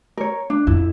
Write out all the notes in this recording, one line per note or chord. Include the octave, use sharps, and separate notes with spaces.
A#4 C#5
D4
F2 E4